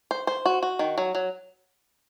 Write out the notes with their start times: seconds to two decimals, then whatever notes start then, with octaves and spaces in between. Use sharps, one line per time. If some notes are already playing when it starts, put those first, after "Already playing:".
0.11 C5
0.27 C5
0.45 F#4
0.63 F#4
0.79 D#3
0.98 F#3
1.15 F#3